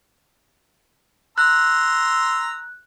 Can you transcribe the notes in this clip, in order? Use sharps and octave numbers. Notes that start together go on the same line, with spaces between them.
A#5 C6 E6 F#6